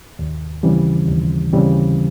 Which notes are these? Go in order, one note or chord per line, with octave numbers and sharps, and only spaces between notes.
D#2
C#3 E3 G3 C4
D#2
C#3 E3 G3 C4